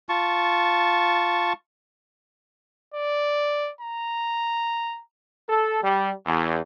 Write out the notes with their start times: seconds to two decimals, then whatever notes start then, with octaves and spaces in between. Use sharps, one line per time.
0.09 F4 A5 C#6
2.94 D5
3.81 A#5
5.48 A4
5.83 G3
6.26 E2